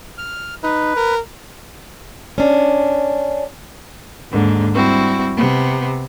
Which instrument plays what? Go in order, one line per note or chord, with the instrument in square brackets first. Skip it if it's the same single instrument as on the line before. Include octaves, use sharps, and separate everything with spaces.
[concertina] F6
[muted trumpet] D#4 [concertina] B4
[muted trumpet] A#4
[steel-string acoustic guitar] C#4 D4
[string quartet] D#2 G#2 D3
G3 C4 E4 F#4
C3 B3